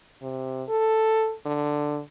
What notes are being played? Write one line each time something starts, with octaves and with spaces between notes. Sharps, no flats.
C3
A4
D3